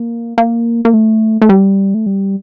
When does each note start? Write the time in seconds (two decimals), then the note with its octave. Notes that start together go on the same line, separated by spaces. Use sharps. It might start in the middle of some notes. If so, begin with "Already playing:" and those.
Already playing: A#3
0.38 A#3
0.85 A#3
0.94 A3
1.42 A3
1.49 G3
1.94 A3
2.06 G3